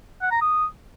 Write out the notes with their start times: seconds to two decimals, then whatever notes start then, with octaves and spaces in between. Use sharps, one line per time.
0.22 F#5
0.32 A#5
0.41 D#6